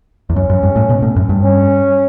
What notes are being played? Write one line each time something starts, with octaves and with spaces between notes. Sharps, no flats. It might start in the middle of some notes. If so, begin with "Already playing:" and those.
E2
F#2 C#4
F#2
G2
A2
B2
A2
F#2
G2
C#4